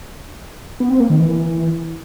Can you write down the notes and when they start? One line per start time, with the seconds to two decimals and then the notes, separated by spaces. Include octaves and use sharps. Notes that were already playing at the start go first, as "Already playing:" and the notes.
0.80 B3
0.90 C4
1.00 A#3
1.10 D#3
1.20 E3